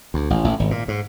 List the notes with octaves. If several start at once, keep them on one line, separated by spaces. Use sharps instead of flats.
D2
A1
A1
G#1
A#2
G#2